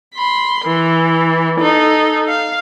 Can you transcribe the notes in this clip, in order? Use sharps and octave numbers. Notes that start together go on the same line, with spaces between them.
B5 C6
E3
D#4 A4
F5